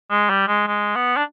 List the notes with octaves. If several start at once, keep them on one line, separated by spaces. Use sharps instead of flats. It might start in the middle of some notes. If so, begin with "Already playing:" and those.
G#3
G3
G#3
G#3
B3
D4